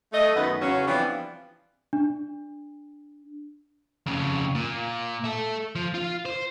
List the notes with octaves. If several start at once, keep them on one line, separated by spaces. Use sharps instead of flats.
A3 D#5
F#2 D#3 B3 B4
E2 C#3 F#3 C#4
E3 F3 G3 B3 C4 D4
D4
F2 C#3
A#2
A4 E5
F3
F4
C5